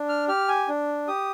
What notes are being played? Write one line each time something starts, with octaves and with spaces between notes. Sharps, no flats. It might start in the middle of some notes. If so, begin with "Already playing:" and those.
Already playing: D4
F6
G4 F6
G#5
D4
G4 D#6